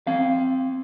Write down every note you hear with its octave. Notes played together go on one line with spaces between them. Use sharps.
C4 F5